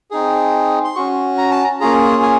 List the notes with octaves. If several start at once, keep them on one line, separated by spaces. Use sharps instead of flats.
C4 D#4 G#4
C6
C#4 F#4 C#6
A#5
A5
A#5
A#3 C#4 F4 G#4 A#5
G#5